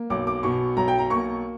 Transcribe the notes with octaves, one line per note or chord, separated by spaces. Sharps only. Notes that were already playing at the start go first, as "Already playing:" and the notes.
Already playing: A#3
B1 D6
D6
B2 C#6
B1 A#5
G5
A#5
A#3 C#6